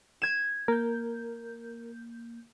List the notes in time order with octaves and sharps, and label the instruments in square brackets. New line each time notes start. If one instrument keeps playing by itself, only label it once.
[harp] G#6 E7
[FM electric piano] A#3 G6 [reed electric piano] A#4